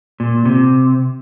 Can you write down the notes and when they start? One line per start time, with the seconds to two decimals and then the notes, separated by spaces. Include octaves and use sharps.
0.20 A#2
0.45 C3